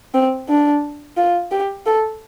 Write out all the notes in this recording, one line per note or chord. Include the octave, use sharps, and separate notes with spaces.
C4
D4
F4
G4
A4